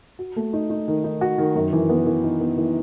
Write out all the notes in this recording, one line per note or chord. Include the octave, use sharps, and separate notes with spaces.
F#4
A3
D#4
D#4
D#3
D#4
F#4
D#3
F#2
E3
B3
E3
D#4
B3
E3